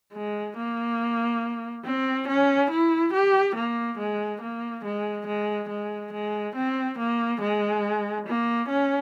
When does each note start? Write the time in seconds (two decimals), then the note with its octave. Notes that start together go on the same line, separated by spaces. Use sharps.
0.13 G#3
0.57 A#3
1.85 C4
2.28 C#4
2.70 E4
3.13 G4
3.55 A#3
3.98 G#3
4.42 A#3
4.85 G#3
5.27 G#3
5.69 G#3
6.13 G#3
6.55 C4
6.99 A#3
7.41 G#3
8.27 A#3
8.68 C#4